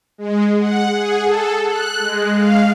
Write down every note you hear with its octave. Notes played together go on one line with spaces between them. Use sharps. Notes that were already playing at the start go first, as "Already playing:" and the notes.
G#3
F#5
G#4
A4
F#6
G#3
F5